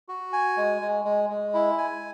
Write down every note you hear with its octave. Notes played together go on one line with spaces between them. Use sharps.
F#4
G#5
G#3
G#3
G#3
G#3
E4
G#5